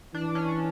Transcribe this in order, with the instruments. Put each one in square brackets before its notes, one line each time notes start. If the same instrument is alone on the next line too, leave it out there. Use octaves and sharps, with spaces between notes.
[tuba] E3 [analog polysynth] D4
[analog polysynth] C#4